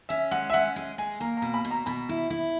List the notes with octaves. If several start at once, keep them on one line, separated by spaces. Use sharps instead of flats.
C#4 E5
G#3 F#5
E5
C#4 F#5
G#3
G#3 G#5
A#3 A#5
B2 A#5
B5
B2
A#5
B2 B5
E4
E4